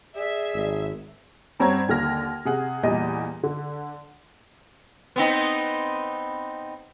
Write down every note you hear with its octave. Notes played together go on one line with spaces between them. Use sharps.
G#4 D5 E5
G#1
G2 C4 C#5 F#5 A#5 G#6
D#2 D3 A#3 F6 A#6
C3 G#4 F#5
E2 A#2 G3 D#5
D3
B3 C4 D#4